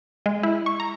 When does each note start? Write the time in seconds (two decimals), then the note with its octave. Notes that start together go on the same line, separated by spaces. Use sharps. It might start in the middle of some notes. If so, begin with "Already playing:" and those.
0.26 G#3
0.43 E4
0.66 C#6
0.80 A#5